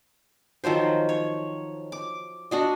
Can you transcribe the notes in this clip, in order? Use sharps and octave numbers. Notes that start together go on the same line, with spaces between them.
D#3 F3 F#3 C5
C#5
D6
D4 F#4 D#5